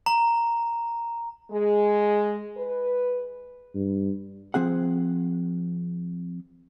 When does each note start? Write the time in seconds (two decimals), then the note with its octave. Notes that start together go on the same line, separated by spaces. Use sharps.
0.06 A#5
1.52 G#3
2.58 B4
3.75 G2
4.54 F3 C4 G#4 F#5